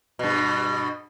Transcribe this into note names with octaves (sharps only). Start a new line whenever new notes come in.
G2 B2